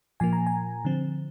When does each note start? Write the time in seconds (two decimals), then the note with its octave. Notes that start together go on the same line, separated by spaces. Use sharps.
0.20 A#2 F3 A#3 G#5
0.33 A#5
0.46 G#5
0.85 D3 F3 C4